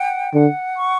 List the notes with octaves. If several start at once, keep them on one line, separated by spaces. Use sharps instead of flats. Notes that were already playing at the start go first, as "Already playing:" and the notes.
Already playing: F#5 G5
D3 F#5
C#6